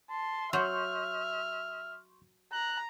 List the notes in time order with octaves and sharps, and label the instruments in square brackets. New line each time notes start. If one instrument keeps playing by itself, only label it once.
[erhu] A5 [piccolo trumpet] C6
[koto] F#3 [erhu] E5 [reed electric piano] C6 C#6 G6 [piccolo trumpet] F6
[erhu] A#5 [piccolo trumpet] F#6